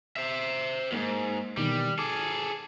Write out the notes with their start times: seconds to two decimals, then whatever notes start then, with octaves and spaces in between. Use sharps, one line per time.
0.16 C5 E5
0.92 E2 G#2 A#3
1.57 B2 D#3 E3 G3
1.99 G#4 A4 D6